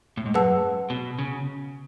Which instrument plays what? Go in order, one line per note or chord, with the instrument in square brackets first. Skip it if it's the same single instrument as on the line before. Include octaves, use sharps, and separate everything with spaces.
[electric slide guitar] A2
G#2
[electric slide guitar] F#2 [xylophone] G#4 B4 F#5 A5 E6
[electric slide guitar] B2
C#3